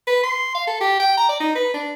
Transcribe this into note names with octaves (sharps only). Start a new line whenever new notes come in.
B4
C6
F5
A4
G4
G5
A#5
D5
D#4
B4
D4